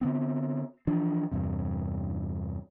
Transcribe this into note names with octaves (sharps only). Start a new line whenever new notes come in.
D3 B3 C4
E3 F3 D4
E2 G2 C3